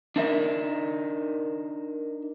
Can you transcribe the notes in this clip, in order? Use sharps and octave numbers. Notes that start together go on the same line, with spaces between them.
D4 D#4 A#4 E5